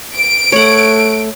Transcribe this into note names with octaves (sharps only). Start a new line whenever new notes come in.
D7
A3 C#5 F#5